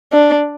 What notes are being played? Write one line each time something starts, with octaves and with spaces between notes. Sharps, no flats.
D4